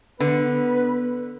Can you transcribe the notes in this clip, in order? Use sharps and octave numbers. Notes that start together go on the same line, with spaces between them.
D3 B3 B4